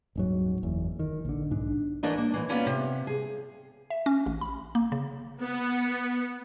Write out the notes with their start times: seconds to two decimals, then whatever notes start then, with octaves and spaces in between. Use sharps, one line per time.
0.15 D#1 G#2 F#3
0.63 F#1 E2
0.99 D#3
1.25 A#1 D3
1.50 B1 G#2 D4
2.03 E3 A3 D4 A#4 D#5
2.18 A#3
2.34 A#2 E3
2.49 A#3 B3 C#4 F4 D5
2.66 C3
3.07 G#4
3.90 E5
4.06 C#4
4.26 A1
4.41 B5
4.75 A#3
4.92 C#3
5.41 B3